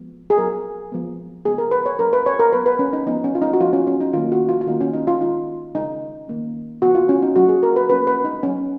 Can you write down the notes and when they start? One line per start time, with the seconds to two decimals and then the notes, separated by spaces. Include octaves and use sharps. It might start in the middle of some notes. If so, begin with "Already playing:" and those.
Already playing: F3 G#3 B3
0.30 G#4
0.38 F#3 B3 A#4
0.92 F3 G#3 B3
1.45 C#3 G#3 B3 G#4
1.58 A#4
1.71 B4
1.86 C#5
1.99 F#3 C#4 A#4
2.13 B4
2.26 C#5
2.39 A#4
2.53 F#3 B3 B4
2.66 B4
2.79 C#4
2.93 D#4
3.06 F3 B3 D#4
3.24 C#4
3.35 F4
3.42 D#4
3.53 F#4
3.60 F3 B3 F4
3.73 C#4
3.87 C#4
4.01 D#4
4.13 D#3 F#3 A#3 C#4 F4
4.32 F#4
4.49 F4
4.61 F4
4.67 D#3 A#3 C#4 D#4
4.81 C#4
4.93 D#4
5.07 F4
5.21 D#3 G#3 C#4 D#4
5.75 C#3 G#3 C#4 D#4
6.28 D#3 A#3 C#4
6.82 C#3 F3 B3 F#4
6.95 F4
7.09 C#4
7.22 D#4
7.36 F#3 A#3 C#4 F#4
7.49 G#4
7.63 A#4
7.76 B4
7.89 F3 A#3 C#4 B4
8.07 B4
8.25 D#4
8.43 C#4
8.47 F#3